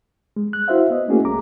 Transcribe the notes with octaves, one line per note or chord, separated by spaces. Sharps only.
G#3
F#6
E4 F#4 C5 E5 F5
B3 D#5
A3 A#3 C#4 E4 F#4 G#4
C2 G3 A#5 D6